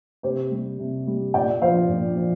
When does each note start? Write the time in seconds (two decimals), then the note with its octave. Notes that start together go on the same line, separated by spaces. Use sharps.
0.23 C3 G4 C5
0.51 G3
0.79 C3
1.07 G3
1.34 A#2 D5 G5
1.62 F3 C5 F5
1.89 A#2
2.17 F3